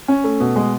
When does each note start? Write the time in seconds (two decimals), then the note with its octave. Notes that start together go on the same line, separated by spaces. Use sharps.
0.08 C#4
0.24 A3
0.40 B2
0.56 G#3